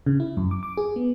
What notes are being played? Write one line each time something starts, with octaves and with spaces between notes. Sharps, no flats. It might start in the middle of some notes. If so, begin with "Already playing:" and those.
C#3
E4
F#2
D6
D6
G#4
B3